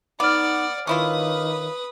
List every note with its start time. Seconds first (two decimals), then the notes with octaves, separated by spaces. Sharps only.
0.20 B3 D#4 D5 F#5 D6 F6
0.87 D#3 C#4 E4 F4 B4 D#6